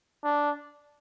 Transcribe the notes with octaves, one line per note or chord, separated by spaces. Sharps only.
D4